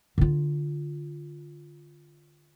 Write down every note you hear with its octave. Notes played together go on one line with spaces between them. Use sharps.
D3 F4